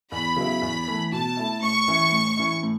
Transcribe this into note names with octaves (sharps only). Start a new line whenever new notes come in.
E2 B5
C#3 F#3 B3 E4
E2
E3 A3
B2 A5
A3 E4
A2 C#6
E3 C#4 E4
A2
E3 C#4 E4
A2